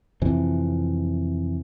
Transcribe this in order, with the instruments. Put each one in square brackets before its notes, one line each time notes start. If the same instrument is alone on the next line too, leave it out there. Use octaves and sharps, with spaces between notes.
[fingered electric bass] F2 C3 E3